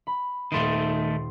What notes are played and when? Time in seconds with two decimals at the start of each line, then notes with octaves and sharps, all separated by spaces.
0.07 B5
0.52 D#1 D#3 A3 C6 C7